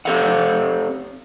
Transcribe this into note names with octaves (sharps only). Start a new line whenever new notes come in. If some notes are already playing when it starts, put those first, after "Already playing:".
C4 G4 A4 C5 F5 F#5